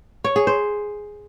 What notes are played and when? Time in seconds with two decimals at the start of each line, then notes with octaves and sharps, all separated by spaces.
0.24 C#5
0.36 G#4
0.47 C5